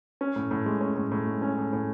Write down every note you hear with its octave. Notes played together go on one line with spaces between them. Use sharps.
C#4
A2
A2
G#3
C#4
A2
A2
G#3
C#4
A2
A2